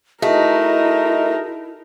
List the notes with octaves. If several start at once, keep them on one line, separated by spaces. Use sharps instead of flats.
A3 D#4 E4 F#4 G#4 A#4 D#5